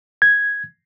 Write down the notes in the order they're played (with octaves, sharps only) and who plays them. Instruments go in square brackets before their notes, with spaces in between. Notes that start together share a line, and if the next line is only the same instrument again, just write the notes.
[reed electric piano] G#6